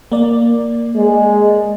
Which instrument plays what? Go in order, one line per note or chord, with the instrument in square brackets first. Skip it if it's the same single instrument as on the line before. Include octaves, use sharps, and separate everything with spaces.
[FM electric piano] A#3 D5
[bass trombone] G#3